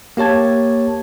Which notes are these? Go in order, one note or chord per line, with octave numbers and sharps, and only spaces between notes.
A#3 G4 C#5 A5 G#6